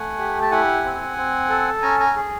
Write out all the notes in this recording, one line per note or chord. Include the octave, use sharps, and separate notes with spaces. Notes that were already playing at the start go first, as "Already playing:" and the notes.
Already playing: A3 F#5 G#5
G4
A5
E4 F#5 G#5
C4
C4
A4
C#4 G#5 A#5
G#5 A#5
G#4